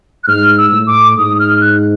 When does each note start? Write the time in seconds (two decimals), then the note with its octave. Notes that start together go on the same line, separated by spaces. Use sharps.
0.24 F#6
0.28 G#2 F6
0.58 E6
0.72 A2
0.87 D6
1.18 G#2 D#6
1.39 F6
1.61 F#6